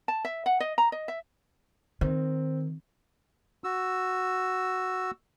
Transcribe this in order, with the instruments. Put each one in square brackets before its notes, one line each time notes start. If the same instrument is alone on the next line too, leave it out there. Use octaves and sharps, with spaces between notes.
[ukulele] A5
E5
F#5
D#5
A#5
D#5
E5
[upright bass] D#3 [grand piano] C4
[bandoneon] F#4 E6